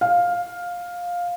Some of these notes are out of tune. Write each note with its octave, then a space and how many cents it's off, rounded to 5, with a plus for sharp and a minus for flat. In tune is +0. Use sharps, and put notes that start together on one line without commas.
F5 +10